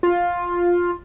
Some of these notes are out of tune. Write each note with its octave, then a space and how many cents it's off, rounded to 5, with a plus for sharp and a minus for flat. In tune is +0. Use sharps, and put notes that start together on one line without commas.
F4 +10